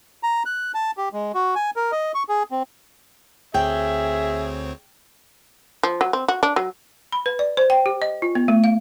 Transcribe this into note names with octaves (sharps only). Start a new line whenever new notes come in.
A#5
F#6
A5
G4
G#3
F#4
G#5
A#4
D#5
C#6
G#4
C4
D2 C4 G#4 C#5 E5 G5
F3
F#3
C4
F#4
D4
F#3
B5
B4
D5
C5
G5
G4
D#5
F4
B3
A3
F5